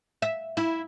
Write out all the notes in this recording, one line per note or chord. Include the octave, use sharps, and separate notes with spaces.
E5
E4